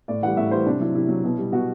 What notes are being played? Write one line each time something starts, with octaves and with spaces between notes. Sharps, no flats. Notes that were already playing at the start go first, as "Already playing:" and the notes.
A2 D5
E3 G3 F#5
A2 E5
E3 G3 C5
C3 D4
F#3 E4
C3 E4
F#3
B2
G3
B2 F#4